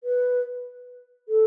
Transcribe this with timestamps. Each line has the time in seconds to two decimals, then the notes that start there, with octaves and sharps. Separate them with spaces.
0.03 B4
1.28 A4